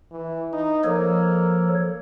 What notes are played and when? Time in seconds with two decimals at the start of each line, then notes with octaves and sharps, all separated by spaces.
0.11 E3
0.53 D#4
0.84 F3 A#3 A4 C#5